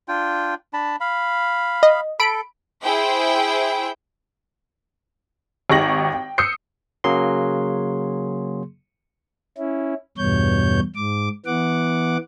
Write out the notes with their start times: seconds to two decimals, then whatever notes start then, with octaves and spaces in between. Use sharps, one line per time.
0.08 D4 F4 G5
0.73 D4 A5 B5
1.00 F5 B5
1.83 D#5
2.20 A4 B5 D7
2.82 E4 G#4 C5 G5
5.70 G#1 D#4 G4 C#6 A#6 F#7
6.13 G5
6.38 D#6 E6 G6 C7 C#7
7.04 C#3 F#3 A#3 G#4 C6
9.58 C#4 E4
10.17 E2 G2 B2 C#5 G6
10.95 G#2 D6
11.46 E3 B3 F#5 D6